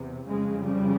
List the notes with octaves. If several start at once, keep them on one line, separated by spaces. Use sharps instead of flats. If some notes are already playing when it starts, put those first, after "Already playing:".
Already playing: E2 C3
F2 C#3 G#3
G3